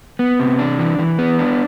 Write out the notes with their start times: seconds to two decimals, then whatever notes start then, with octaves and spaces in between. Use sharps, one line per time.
0.19 B3
0.39 C3
0.59 D4
0.79 E3
0.99 E3
1.19 B3
1.39 D4